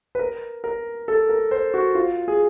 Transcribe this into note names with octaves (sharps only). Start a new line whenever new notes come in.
B4
A#4
A#4
A4
A#4
C5
F#4
F4
G#4